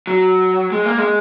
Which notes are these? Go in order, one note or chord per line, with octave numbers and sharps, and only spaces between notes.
F#3
G#3
A#3
G#3